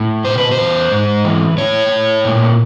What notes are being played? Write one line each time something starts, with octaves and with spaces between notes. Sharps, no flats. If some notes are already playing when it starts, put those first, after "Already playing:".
Already playing: A2
B2 C5
B4
C5
E2
G#2
E3
A2 C#5
A2
A#2